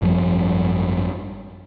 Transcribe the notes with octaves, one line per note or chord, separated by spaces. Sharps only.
G#1 F#2 F3 G3